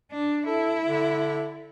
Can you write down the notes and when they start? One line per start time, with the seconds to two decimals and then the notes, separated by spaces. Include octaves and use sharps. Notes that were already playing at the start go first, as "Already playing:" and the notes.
0.11 D4
0.47 E4 A4
0.86 D3